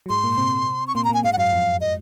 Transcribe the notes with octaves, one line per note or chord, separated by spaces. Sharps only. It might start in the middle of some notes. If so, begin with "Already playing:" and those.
F#3
G#2 G#3 C6
A#2 A#3
C3 C4
C#6
A#2 A#3 C6
A#5
A#2 A#3 G#5
G#2 G#3 F5
F#5
F#2 F#3 F5
F2 F3
D#5